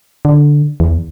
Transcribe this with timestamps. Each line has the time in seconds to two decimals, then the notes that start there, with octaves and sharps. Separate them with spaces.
0.25 D3
0.80 E2